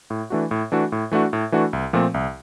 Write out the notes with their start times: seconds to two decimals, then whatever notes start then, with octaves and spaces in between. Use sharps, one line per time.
0.10 A2
0.30 E3 A3 D4 F#4
0.51 A2
0.72 E3 A3 D4 F#4
0.92 A2
1.11 E3 A3 D4 F#4
1.33 A2
1.52 E3 A3 D4 F#4
1.73 C2
1.93 A#2 F3 A3 C4
2.14 C2